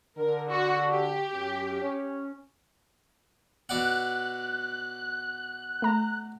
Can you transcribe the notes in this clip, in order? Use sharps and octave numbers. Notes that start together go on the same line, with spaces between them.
D3 A#4
F#4
G4
F#2 C#4
C#4
B2 D5 F#5 F#6
A3 A#5